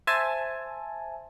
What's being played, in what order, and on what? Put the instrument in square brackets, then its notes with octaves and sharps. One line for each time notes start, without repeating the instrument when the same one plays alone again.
[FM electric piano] C5 E5 G#5 A5